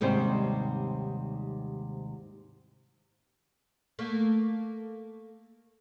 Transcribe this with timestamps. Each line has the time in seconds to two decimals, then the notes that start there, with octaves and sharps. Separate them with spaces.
0.01 D#2 G#2 C3 G3 C#4 C5
3.99 A3 A#3